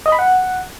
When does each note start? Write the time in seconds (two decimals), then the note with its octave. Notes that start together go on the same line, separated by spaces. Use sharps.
0.06 D#5
0.12 B5
0.19 F#5